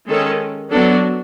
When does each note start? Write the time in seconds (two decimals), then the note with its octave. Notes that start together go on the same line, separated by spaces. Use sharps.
0.08 D#3 G#3 C#4 A4
0.71 F#3 B3 D4 A4